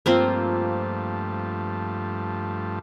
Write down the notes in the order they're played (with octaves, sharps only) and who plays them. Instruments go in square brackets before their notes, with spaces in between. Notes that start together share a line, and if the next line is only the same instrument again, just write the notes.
[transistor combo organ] G2 F3 A3 [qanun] A#3 C4 F4